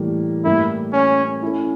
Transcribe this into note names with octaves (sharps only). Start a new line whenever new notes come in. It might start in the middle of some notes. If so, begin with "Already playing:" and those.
Already playing: A2 E3 G3 A#3
A2 G3 A#3 E4
C#4
A3 C#4 E4